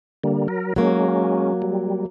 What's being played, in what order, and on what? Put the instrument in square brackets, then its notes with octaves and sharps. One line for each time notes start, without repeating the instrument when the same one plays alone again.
[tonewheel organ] D3 G3 A#3
F#3 A#4
[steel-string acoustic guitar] F#3 A#3 [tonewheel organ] G#3 C#4
[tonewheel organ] G3